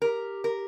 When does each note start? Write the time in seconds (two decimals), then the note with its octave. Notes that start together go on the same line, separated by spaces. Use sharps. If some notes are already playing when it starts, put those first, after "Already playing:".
0.02 G4 A#4
0.44 A#4